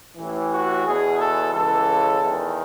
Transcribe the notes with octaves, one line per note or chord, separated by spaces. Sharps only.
A1 A2 E3
F#4
E2 B2 G#4
A4
C#2 C#3 E3 A4
E2 D#3